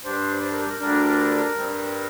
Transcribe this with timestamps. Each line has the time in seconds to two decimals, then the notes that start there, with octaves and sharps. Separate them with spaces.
0.04 G2 G3 D4 C5
0.42 C5
0.52 A#4
0.60 G4
0.69 A#4
0.80 D2 D3 G3 D4 A#4
1.56 G2 G3 C4